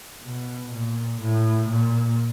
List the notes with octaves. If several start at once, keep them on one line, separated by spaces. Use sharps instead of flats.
B2
A#2
A2
A#2